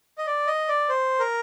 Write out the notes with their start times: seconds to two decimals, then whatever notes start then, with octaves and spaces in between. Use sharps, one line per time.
0.18 D#5
0.27 D5
0.47 D#5
0.68 D5
0.89 C5
1.20 A#4